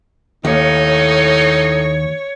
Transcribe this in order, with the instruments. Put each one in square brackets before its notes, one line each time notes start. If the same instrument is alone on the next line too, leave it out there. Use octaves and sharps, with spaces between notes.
[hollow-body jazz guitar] D#2 [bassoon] A2 [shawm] D#4 [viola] C#5